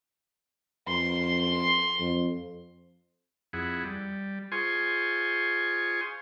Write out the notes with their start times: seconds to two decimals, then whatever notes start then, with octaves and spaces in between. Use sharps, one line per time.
0.88 F2 C6
2.00 F2
3.53 F2 E4 G#4 F#5
3.84 G3
4.52 F4 G#4 C5 G#5 C6 C#6